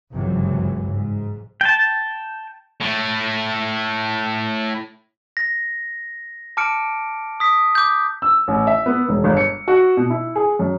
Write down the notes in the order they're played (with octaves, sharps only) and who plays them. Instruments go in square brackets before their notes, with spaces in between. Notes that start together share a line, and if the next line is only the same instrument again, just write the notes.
[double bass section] G1 C#2 F#2 C3 E3 F#3
G#2
[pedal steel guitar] G5 A5
[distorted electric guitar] A2 A3
[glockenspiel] A#6
A5 D6 F6 C#7 D7
D#6 B6
D6 G6
[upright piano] E6
A1
E5
B3
E1
G1
C#7
F#4
B2
E4
G#4
F#2